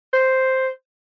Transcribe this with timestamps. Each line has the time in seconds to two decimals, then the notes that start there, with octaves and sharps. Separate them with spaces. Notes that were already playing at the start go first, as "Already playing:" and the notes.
0.13 C5